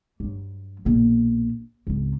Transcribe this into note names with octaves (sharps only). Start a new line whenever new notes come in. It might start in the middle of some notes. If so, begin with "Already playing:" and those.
G2 F#3
A#1 B2
G#1 C#2